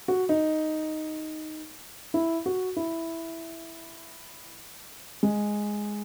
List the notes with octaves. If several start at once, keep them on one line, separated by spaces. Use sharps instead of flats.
F#4
D#4
E4
F#4
E4
G#3